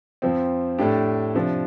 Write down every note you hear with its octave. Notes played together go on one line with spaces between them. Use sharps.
F2 F3 C4
A2 A3 D4 G4
C3 F3 D4